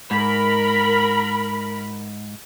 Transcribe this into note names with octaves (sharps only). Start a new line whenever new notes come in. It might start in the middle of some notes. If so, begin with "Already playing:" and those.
G#2 A#4 B5